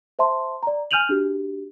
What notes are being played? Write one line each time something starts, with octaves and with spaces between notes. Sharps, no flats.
C5 E5 A5 C6
D5 A#5
G#5 F6 G6 D#7 F7 F#7
D4 F#4 G4